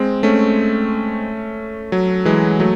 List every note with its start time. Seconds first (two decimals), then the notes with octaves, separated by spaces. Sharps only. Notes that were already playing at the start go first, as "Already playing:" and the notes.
Already playing: G#3 C4
0.23 A3 C#4
1.92 F#3
2.25 E3 G#3
2.60 F#3 A3